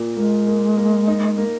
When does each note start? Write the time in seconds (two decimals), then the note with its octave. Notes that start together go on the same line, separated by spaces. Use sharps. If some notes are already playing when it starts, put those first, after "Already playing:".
Already playing: A#2 A#3
0.17 G#3 A#3
0.47 A#3
0.77 A#3
1.07 D#4
1.38 A#3